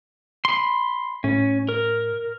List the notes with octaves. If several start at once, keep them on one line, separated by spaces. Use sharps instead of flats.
B5 C6
A2 C#4
A#4